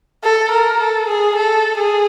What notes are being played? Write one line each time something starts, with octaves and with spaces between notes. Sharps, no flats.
A4
A#4
A4
G#4
A4
G#4